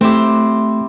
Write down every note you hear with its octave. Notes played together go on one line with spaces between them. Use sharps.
A3 C4 E4 G4